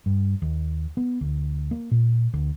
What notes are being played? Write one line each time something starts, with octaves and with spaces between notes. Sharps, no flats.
G2
D#2
B3
D2
A#3
A#2
D2